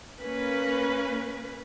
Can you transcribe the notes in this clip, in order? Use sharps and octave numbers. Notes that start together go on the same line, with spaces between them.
A#3 C#4 B4